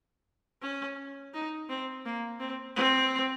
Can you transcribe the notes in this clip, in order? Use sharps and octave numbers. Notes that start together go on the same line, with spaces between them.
C#4
D#4
C4
A#3
C4
C4